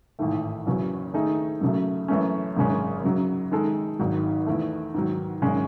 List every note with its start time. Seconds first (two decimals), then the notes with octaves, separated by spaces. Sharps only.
0.19 A1 G#2 D#3 A3
0.66 F#1 E2 C#3 F#3 C#4
1.14 D#3 A3 D#4 G#4
1.61 F#2 C#3 F#3 A3
2.08 F#2 E3 A3 C#4
2.56 G#1 F#2 C#3 G#3 C#4
3.04 F#2 C#3 F#3
3.51 D#3 G#3 D#4 A4
3.99 G#1 G#2 D#3 F#3
4.46 E2 D#3 A3
4.94 G#2 D#3 F#3
5.42 G#1 F#2 C#3 G#3 C#4